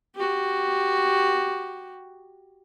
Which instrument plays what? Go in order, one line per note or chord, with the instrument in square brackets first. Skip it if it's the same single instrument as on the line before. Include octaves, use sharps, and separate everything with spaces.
[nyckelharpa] F#4 G4